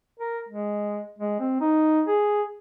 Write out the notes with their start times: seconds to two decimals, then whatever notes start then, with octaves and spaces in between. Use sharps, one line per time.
0.20 A#4
0.49 G#3
1.19 G#3
1.40 C4
1.61 D#4
2.07 G#4